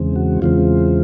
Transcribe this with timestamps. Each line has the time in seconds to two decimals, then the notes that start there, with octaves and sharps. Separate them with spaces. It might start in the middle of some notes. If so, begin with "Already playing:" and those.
Already playing: E2 C#3 E3 G#3 C4
0.16 F#4
0.42 E2 C#3 E3 G#3 C4 F4